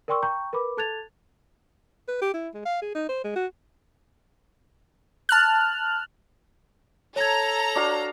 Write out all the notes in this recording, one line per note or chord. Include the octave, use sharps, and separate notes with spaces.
A#4 D5 G5 C6 C#6 E6
G5 A#5 C#6 G6
A#4 B4 B5 D6
A4 A5 F#6 G#6 A6 F7
B4
G4
E4
G#3
F5
G#4
D#4
C5
G#3
F#4
A5 F6 F#6
A4 C#5 A#5 G#6
D4 F#4 F5